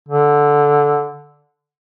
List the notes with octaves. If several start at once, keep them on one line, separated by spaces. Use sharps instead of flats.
D3